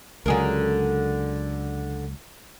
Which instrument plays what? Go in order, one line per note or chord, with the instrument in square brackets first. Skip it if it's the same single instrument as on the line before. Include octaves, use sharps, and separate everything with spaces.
[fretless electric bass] C#2 F#3 [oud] D3 G#4 A#4